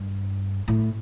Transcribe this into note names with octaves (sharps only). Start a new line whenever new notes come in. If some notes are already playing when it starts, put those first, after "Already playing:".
Already playing: G2
A2